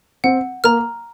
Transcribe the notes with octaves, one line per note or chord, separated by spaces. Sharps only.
C4 F#5
A#3 A#5 F6